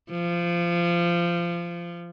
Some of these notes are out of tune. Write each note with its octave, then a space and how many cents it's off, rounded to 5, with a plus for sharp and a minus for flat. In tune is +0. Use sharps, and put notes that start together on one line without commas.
F3 -20